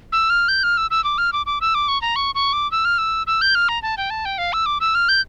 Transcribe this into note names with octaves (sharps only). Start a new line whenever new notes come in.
E6
F6
G6
F6
E6
E6
D6
F6
D6
D6
E6
D6
C#6
A#5
C#6
C#6
D6
E6
F6
E6
E6
G6
F6
A#5
A5
G5
A5
G5
F5
E6
D6
E6
F6
G6